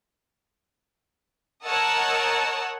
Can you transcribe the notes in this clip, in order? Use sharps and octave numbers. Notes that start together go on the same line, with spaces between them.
A#4 C#5 D#5 F#5 A5 E6